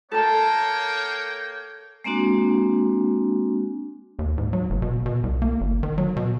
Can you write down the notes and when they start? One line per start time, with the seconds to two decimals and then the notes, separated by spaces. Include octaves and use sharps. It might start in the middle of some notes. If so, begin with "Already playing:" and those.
0.12 A#3 A4 A#4 C#5 G5 A5
2.04 G#3 A#3 C4 D4 F#4
4.19 D#2
4.38 G#2
4.53 F#3
4.70 F#1
4.82 B2
5.06 B2
5.23 C2
5.42 A#3
5.61 G1
5.83 D#3
5.98 F#3
6.16 B2